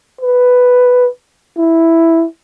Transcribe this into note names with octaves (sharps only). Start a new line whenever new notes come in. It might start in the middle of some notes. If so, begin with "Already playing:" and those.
B4
E4